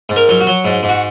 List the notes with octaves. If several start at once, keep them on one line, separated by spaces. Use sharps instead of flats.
G#2
A#4
F#3
F#4
F#3
G#2
G#2
F#4